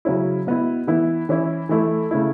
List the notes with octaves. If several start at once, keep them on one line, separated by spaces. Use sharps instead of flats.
C#3 F#3 C#4 E4
B2 B3 E4
E3 B3 E4
E3 C#4 E4
E3 A3 E4
C#3 A3 E4